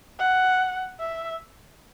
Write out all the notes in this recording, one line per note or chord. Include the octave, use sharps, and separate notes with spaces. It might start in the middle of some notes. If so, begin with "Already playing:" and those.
F#5
E5